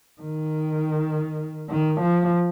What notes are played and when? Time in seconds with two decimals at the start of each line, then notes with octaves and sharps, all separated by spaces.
0.21 D#3
1.70 D#3
2.01 F3